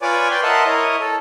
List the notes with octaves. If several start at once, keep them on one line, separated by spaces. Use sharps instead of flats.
F4 B4 C#5 D5 G#5 D6
B4 D5 G5 C6
A#4 D#5 E5 F#5 A5 C6
E4 A#4 C#5 D#5
A4